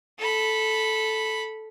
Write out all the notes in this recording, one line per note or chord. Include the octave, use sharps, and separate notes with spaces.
A4 B5